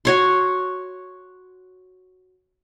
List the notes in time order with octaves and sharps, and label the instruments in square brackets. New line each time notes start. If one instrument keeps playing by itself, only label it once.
[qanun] F#4 C#5 C6